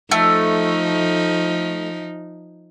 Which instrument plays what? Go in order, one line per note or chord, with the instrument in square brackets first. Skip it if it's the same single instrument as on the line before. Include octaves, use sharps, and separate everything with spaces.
[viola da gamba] F3 D#4 [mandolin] A3